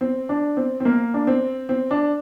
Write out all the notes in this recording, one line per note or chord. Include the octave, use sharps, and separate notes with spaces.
C4
D4
C4
C4
A#3
D4
C4
C4
D4